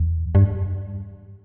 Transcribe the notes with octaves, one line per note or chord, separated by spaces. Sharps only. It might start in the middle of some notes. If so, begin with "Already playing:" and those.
Already playing: E2
G2